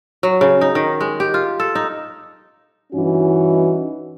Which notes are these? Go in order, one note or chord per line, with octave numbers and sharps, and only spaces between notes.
F#3
C#3
D#4
D#3
G#3
G4
F4
A4
D#4
G2 E3 C#4 D#4 F#4